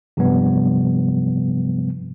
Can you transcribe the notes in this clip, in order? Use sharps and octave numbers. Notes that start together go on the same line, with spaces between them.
G2 C3 F3 G3 B3